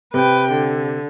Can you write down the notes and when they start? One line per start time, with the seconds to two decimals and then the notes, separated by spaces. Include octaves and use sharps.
0.14 C3 B4 G5
0.52 D3